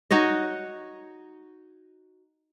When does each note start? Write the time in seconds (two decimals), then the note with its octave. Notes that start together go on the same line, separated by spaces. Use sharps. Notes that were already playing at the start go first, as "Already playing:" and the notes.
0.11 D#4 F#4 C#5 D#5